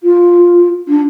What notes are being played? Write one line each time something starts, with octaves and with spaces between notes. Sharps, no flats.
F4
D4